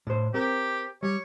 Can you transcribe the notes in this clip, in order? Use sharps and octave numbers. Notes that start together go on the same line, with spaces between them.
A2 C5
C4 G4 A#4
G3 C#5